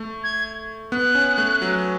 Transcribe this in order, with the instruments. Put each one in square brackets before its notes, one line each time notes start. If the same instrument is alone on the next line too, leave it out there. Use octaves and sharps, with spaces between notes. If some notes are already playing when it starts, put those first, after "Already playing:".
Already playing: [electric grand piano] A3
[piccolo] G#6
[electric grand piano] B3 [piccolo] F#6
[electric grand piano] C#4
A3
F#3